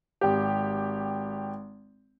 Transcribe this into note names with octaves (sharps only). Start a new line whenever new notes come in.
G#1 G4